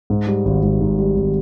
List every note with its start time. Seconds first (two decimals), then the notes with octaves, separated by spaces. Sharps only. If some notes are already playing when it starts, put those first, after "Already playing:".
0.10 G#2
0.27 G3
0.45 G#1
0.63 G#1
0.81 G#2
0.99 G3
1.16 G#1